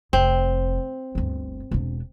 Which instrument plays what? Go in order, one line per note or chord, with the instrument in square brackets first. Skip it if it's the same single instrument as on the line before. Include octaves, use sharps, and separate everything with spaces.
[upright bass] F1 [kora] C4
[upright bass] G1 D2
E1 D4